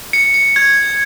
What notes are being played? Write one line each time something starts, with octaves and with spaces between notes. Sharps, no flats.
C#7
C#7
G#6